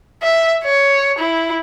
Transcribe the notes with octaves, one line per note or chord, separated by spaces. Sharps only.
E5
C#5
E4